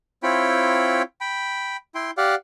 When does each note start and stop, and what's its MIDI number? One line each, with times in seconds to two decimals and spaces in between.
0.23 1.02 60
0.23 1.02 64
0.23 1.02 65
0.23 1.02 73
0.23 1.02 79
0.23 1.02 83
1.21 1.77 79
1.21 1.77 83
1.95 2.11 64
1.95 2.11 79
1.95 2.11 84
2.17 2.35 67
2.17 2.35 74
2.17 2.35 77
2.17 2.35 78